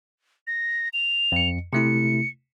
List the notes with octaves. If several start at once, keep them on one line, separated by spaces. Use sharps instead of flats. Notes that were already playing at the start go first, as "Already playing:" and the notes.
A#6
F7
F2 C#7
C3 A3 E4 C#7